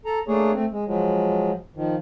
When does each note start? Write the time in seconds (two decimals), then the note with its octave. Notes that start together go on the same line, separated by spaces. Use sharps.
0.05 A4 A#5
0.28 A3 A#3 D4 G#4 C#5
0.53 A3 C4
0.72 G#3
0.86 F3 F#3 G#3
1.76 D#3 F3